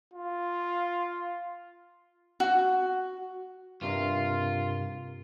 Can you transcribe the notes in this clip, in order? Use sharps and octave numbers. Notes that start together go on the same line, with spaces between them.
F4
F#4
G2 C3 F4 A#4